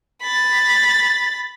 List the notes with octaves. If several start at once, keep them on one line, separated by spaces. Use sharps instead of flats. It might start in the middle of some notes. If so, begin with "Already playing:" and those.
B5 A6